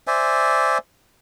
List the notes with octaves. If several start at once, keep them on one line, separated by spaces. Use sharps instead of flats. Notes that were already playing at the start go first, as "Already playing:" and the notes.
C5 D5 E5 G#5